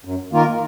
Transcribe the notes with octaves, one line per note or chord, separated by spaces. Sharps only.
F#2
D#3 A#3 F4 A#4